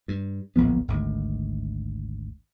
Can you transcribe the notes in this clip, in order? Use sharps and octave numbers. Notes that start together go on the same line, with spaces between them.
G2
D1 A#1 F3 B3
G#1 D2 G#2